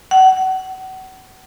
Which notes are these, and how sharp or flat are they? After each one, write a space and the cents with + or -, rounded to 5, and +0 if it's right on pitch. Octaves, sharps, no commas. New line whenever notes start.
F#5 +30